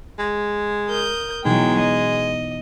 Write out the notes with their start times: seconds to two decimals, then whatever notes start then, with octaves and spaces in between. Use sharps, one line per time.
0.19 G#3
0.88 A#4 D#6 G6
1.45 B2 E3 F#3 G#3 D#4 G5
1.80 D#5